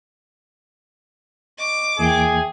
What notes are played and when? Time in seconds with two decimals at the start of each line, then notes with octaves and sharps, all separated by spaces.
1.58 D#5 C#6 D6
1.99 E2 E3 A#3 G#4 E5 G5